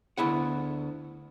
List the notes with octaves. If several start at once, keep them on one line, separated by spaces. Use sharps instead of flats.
D2 B3 E4 F#5